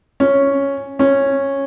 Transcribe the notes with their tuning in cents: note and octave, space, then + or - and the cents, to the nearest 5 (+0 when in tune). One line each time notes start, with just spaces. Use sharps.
C#4 +0
C#4 -10